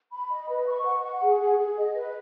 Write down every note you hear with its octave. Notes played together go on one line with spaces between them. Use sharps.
B5
D#5
B4
C#6
F#5
F#5
G#4
G#4
G#4
D#5
B4